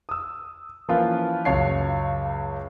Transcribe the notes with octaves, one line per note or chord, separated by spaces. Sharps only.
D#6 E6
E3 F3 A#3 C#4 F4 B4
C#2 F#2 C#5 F5 A5 C7